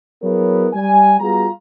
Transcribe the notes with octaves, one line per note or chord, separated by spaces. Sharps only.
F#3 B3 E4 G#4 A#4 C#5
G3 G#5
G3 B3 F4 F#4 G#4 A#5